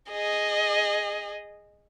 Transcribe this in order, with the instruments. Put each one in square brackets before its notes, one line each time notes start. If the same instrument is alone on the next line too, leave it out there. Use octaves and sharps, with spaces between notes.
[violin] G#4 D#5